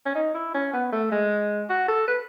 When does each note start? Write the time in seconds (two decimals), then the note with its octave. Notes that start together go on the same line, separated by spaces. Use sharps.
0.06 C#4
0.15 D#4
0.34 E4
0.54 C#4
0.73 B3
0.92 A3
1.11 G#3
1.69 F#4
1.88 A4
2.08 B4